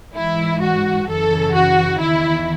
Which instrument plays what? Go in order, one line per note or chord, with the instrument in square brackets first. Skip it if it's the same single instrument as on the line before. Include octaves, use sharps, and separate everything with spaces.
[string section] G#2 E3 E4
F#4
F#2 C#3 E3 A4
F#4
E2 D#3 E4